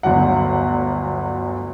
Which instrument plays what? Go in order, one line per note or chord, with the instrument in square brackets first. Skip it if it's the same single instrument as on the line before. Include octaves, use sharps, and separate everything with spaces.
[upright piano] G1 D2 F#3 F#5